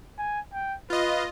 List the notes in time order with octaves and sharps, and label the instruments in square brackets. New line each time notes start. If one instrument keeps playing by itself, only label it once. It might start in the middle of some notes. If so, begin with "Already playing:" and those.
[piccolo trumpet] G#5
G5
[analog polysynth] F4 D#5 [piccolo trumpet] B4